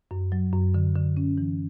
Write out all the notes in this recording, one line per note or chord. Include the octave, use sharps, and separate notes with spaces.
F#2
F#3
F#2
D3
D3
C#4
E3